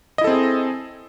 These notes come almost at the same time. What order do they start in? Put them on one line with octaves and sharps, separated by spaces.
D#5 E4 A4 C4 G#4